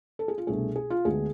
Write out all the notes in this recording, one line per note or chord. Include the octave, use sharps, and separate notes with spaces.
A4
G#4
F4
C2 B2 A3 D4 G#4
G#4
F4
D2 D3 G#3 B3 D4 G#4